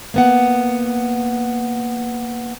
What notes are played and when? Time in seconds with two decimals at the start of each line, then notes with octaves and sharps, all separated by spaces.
0.14 A#3 B3 F#5